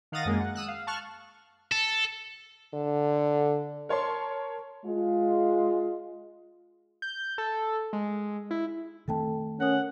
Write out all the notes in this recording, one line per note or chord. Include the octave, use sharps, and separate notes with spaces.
D#3 F5 F#5 D#6 A6 A#6
F#2 G#3 A#3
F#5
D#6 E6 F#6
F5
A5 C#6 F6 F#6
A4
D3
A#4 C#5 A5 C6
G#3 F4
G6
A4
G#3
E4
D#3 A3 C4 A4 G5 A5
C#4 A#4 F#5 D#6